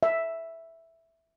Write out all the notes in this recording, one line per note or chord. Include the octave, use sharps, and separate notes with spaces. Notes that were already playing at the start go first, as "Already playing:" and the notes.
E5